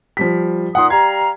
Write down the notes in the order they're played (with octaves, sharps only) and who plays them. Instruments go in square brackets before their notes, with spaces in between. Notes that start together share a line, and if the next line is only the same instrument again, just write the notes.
[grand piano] F3 G3 B6
[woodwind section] A#2 D#4 D#6 [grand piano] F#5 C6
[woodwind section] G3 F5 A#5 [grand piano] G#6